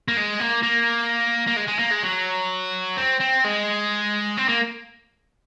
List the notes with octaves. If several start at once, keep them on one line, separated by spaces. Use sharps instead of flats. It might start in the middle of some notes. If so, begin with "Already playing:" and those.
A#3
G#3
A#3
A#3
A#3
G#3
G#3
A#3
G#3
F#3
C4
C4
G#3
C4
A#3